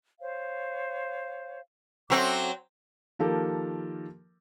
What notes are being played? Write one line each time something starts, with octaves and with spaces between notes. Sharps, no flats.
C5 C#5 F5
F#3 C4 A4 E5 D6
D#3 F3 A#3 G4 A4 A#4